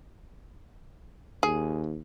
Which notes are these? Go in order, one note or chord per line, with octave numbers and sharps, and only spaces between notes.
D#2 G#4